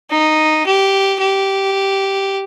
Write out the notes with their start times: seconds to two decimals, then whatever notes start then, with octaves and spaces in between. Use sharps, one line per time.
0.11 D#4
0.66 G4
1.20 G4